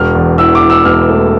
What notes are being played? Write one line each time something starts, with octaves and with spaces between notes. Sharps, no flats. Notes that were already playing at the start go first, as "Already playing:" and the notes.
Already playing: E1 F6
E2
E3 E6
D6
E3
E6
E1 F6
A3